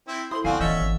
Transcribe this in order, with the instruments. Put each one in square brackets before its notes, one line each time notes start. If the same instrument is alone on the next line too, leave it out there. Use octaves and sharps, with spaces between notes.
[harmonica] C4 E4
[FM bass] E4 [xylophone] A4 C5 D#6 [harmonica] C6
[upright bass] D3 B3 [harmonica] F3 C4 F#4 [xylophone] D5 F5 G#5
[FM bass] D1 [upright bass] E3 B3 [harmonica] C#4 E5 [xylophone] D#5 F#5 A6
[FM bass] G#1